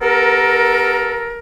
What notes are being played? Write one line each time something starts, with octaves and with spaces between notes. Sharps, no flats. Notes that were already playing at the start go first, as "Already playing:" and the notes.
B3 G4 A4 A#4